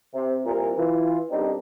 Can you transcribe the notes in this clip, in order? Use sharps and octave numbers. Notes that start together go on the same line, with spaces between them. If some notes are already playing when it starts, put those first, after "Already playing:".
C3
C2 A#2 A#4
E3 F4
B1 F#2 G3 C4 D4 D#4